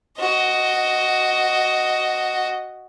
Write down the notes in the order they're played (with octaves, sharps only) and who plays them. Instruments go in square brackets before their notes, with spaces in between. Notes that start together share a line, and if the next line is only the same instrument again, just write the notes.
[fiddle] F#4 D#5